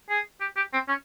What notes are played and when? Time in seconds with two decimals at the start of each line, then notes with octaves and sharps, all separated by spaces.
0.10 G#4
0.41 G4
0.57 G4
0.73 C4
0.88 C#4